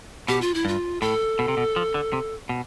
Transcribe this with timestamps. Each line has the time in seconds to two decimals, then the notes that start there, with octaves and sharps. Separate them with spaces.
0.28 B2 G4
0.41 F4
0.54 E4
0.65 G2 F4
1.01 A2 A4
1.39 B2
1.48 C3
1.57 B2
1.76 F3
1.94 D3
2.13 C3
2.49 B2